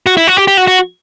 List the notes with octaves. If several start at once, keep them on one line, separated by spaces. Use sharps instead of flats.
F#4
E4
F#4
G4
G4
F#4
F#4